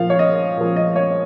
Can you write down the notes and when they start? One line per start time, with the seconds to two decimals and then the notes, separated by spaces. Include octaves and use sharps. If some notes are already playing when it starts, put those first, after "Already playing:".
Already playing: A#2 F3 F5
0.10 C#5
0.19 D#5
0.57 A#2 F3
0.76 D#5
0.96 C#5